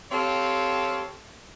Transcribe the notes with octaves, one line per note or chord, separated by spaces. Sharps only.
C4 G4 A4 C#5 F5